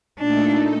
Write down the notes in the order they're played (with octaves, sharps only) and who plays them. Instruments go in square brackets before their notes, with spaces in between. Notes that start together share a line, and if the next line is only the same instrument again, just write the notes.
[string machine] A#2 A3 D#4 A4 [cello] D4